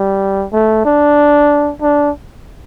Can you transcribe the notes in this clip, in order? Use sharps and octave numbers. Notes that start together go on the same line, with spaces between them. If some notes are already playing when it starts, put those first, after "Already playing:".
Already playing: G3
A3
D4
D4